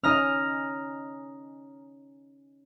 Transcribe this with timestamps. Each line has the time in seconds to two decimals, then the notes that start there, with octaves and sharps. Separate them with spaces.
0.04 C#4 D#4 D#5 A#5 F6